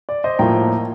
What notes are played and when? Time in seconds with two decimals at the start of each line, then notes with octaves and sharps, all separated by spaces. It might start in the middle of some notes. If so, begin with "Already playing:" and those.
0.09 D5
0.24 C5 D#5
0.39 A2 F3 A#3 G5 A#5